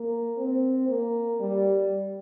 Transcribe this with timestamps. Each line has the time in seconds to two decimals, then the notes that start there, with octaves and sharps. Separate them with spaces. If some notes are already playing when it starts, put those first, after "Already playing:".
Already playing: A#3
0.37 C4
0.88 A#3
1.40 G3